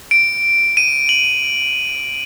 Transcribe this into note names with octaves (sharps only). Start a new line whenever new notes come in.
D7
D#7
F#7